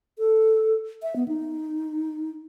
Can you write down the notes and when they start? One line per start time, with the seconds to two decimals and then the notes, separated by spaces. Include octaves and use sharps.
0.19 A4
1.02 E5
1.16 B3
1.28 D#4